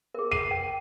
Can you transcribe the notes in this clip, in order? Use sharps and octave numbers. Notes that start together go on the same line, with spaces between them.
G#4 A#4
C7 D#7
G5